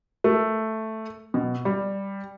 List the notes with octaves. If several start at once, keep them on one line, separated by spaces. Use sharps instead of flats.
A3
B2
G3